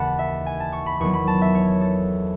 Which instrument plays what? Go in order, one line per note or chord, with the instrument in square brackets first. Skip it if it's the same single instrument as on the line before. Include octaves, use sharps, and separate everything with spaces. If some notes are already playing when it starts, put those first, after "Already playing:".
Already playing: [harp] D#2 C#3 E3 F#5 A5 B5
E5
G#5
A5
C#6
B5
E2 D#3 F#3 C#6
B5
A5
E5
C#5
A4